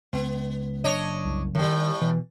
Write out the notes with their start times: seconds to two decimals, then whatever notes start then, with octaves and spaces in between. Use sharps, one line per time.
0.13 C#2 B3
0.84 F#1 D4 C#5 D#5
1.25 C2
1.55 A2 D#3 G3
2.01 B2 E3